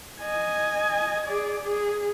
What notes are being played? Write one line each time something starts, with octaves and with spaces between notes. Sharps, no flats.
D#5 G#5
G#4 D5
G#4